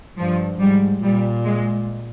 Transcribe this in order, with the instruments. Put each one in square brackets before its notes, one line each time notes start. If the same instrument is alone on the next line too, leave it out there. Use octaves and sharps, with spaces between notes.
[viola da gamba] G2 [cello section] F3
[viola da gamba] G#2 [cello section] G3
[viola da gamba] A#2 [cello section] G3
[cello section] G#3